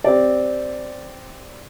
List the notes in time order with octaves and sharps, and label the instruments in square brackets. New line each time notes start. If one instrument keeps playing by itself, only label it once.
[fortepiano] C4 G4 D5